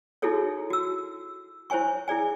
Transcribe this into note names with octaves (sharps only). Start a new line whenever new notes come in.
D#4 E4 F#4 G#4 A4 C#5
F#4 E6
E4 C5 C#5 G#5 C#6
E4 G#4 D5 G#5